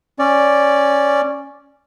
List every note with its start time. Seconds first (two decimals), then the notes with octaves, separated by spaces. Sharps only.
0.19 C#4 D5